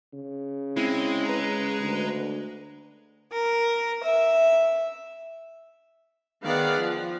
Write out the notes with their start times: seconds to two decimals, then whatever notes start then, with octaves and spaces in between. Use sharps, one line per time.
0.13 C#3
0.76 G#3 C4 E4
1.25 B4 A#5
1.82 D2
3.32 A#4
4.03 E5
6.43 D#3 B3 G#4 D5 F5 F#5
6.80 F3